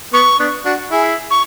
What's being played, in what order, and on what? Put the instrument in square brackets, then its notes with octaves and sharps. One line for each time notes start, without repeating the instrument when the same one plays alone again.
[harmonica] B3 [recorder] C#6
[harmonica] B3 D4
D4 F#4
E4 G#4
[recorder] C#6